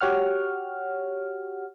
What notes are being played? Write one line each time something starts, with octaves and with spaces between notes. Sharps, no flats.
F#4 G4 C#5 F#5 F6